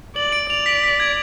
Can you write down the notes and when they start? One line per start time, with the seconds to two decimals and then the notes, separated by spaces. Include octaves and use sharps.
0.16 D5 F#7
0.32 D7
0.50 D5 F7
0.66 B6
0.84 B6
1.00 G#6